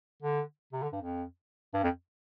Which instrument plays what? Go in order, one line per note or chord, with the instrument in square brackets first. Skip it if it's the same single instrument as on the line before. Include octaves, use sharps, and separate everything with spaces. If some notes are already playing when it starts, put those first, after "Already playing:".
[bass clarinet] D3
C3
D3
G2
F2
G2
F2